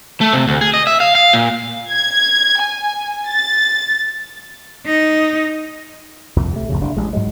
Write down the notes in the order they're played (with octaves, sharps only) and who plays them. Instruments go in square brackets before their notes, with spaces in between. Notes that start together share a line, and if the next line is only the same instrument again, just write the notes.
[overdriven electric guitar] A3
C3
D2
G#4
D#5
E5
F5
F5
A#2
[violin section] G#6
G#5
A6
[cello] D#4
[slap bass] C2 F2 A#2
C3 A3
A#1 F2 C#3
F#1 C3 D4
A1 G#3
G#2 F#3 G#3